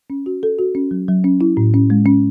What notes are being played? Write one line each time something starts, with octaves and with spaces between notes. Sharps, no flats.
C#4
F#4
A4
F#4
C#4
F#3
F#3
C#4
E4
A2
C#4
G#3
C#4